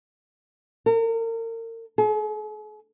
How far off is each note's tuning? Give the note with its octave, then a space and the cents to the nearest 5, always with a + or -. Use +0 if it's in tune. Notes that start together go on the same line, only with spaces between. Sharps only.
A#4 -35
G#4 +45